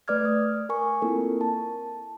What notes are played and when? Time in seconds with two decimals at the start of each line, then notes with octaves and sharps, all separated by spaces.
0.08 A3 B4 D5 D6 F6 G#6
0.25 D#6
0.69 A#4 G#5 C#6
1.02 A#3 C4 E4 F4 A4 A#4
1.41 A5